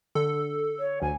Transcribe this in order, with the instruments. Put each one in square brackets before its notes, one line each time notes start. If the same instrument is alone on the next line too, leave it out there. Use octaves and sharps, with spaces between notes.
[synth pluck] D3 [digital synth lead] A4
[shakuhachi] C#5
[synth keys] D2 [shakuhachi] G#5